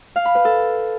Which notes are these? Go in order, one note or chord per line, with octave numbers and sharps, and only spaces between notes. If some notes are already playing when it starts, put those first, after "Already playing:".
F5
B5
B4
A4